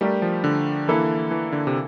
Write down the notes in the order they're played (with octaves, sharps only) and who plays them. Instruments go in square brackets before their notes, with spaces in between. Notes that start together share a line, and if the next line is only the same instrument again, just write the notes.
[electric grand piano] G3 [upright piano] A3 D4 G4 A#4
[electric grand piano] F3
D3
[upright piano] E3 A#3 E4 A4
[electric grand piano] E3
D3
C3